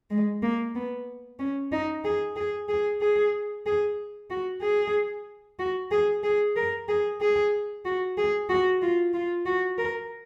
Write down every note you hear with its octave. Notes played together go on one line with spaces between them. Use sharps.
G#3
A#3
B3
C#4
D#4
G#4
G#4
G#4
G#4
G#4
F#4
G#4
F#4
G#4
G#4
A#4
G#4
G#4
F#4
G#4
F#4
F4
F4
F#4
A#4